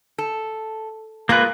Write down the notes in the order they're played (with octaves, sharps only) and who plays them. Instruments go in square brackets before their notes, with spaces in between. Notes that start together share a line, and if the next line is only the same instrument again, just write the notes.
[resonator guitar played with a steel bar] A4
[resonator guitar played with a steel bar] G#3 F4 A#4 [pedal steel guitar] A#3 B4